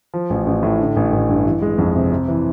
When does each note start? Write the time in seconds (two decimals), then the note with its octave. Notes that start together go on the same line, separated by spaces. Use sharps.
0.14 F3
0.30 A1
0.46 A1
0.63 A2
0.79 D3
0.96 A1
1.12 A1
1.29 G2
1.46 E3
1.62 G#3
1.78 F2
1.96 C3
2.12 C3
2.28 E3